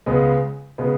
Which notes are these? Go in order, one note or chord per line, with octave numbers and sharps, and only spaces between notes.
C#2 C#3 G#3 B3
C#3 G#3 B3